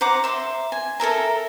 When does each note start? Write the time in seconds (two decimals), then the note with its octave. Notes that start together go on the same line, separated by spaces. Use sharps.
0.01 C5 F#5 A#5 D6
0.24 E5 C6
0.72 G#5
1.00 A4 A#4 E5 A#5